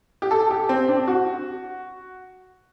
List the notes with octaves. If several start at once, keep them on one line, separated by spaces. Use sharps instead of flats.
G4
A4
G4
C4
D4
F#4